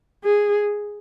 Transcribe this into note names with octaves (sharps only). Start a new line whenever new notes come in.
G#4